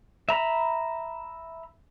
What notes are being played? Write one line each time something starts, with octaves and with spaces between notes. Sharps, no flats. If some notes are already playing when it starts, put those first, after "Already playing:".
E5 A#5 B5